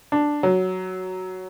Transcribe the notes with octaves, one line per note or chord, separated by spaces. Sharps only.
D4
F#3